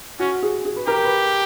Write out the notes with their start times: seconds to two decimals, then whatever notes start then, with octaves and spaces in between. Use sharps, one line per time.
0.20 C#4 F#4
0.42 G#4
0.65 G#4
0.76 B4
0.87 G4 A#4
1.05 B4